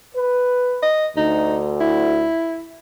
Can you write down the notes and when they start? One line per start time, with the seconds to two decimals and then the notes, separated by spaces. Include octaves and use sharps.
0.15 B4
0.83 D#5
1.17 D2 D#4
1.81 E4